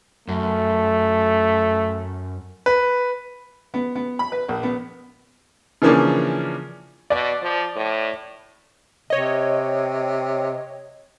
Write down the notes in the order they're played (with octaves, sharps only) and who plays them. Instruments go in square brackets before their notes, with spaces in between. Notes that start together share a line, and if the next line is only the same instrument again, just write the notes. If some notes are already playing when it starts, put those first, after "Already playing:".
[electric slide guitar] F#2 [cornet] A3
[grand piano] B4
[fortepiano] B3
B3
B5
B4
A#1
B3
[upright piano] C#3 E3 F3 A#3 C#4 D4
[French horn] B2 [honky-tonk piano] D5
[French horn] F3
A2
[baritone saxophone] C3 [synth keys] C#5 D#5